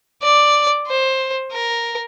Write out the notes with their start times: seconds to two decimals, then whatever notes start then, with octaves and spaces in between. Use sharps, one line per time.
0.23 D5
0.87 C5
1.52 A#4